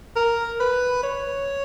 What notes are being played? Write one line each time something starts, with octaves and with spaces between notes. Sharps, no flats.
A#4
B4
C#5